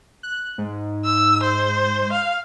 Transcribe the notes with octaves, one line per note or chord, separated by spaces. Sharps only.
F#6
G#2
E6
C5
F5